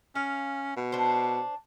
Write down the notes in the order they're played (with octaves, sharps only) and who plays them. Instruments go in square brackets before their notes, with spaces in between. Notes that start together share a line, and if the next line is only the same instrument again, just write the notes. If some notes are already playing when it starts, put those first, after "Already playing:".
[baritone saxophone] C#4 [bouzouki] F5
[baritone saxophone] B2
[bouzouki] D4 C5